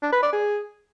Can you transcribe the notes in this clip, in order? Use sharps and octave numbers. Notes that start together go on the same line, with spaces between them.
D4
B4
D5
G#4